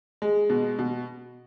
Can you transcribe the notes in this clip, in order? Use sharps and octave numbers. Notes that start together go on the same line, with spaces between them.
G#3
B2
B2